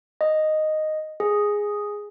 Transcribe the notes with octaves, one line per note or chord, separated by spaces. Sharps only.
D#5
G#4